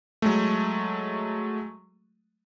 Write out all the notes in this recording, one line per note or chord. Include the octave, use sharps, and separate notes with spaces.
F#3 G#3 A3